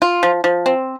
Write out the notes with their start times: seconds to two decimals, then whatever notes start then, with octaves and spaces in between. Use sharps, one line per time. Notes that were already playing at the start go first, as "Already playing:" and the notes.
0.02 F4
0.23 F3
0.44 F3
0.66 C4